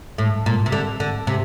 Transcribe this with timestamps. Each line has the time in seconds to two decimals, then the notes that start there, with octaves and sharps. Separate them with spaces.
0.18 A2
0.46 A#2
0.66 C3
0.72 D3
1.00 D3
1.27 C3